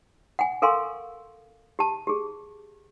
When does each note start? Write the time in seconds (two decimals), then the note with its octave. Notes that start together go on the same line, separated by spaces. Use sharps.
0.39 F#5 G#5
0.62 A4 A#4 F5 G#5 C6 C#6
1.79 G4 A5
2.07 G4 G#4